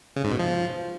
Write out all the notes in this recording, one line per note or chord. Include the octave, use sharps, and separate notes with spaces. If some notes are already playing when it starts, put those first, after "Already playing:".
C#3
G#2
B2
F3